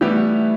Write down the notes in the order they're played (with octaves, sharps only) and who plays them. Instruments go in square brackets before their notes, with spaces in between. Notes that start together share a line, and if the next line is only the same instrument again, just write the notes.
[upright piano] E3 G3 B3 E4 G4 [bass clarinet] A3